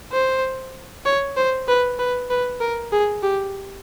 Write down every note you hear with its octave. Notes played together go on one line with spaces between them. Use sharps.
C5
C#5
C5
B4
B4
B4
A#4
G#4
G4